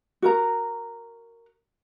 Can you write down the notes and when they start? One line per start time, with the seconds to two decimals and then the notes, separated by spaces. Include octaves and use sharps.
0.22 F#4 A#4 A#5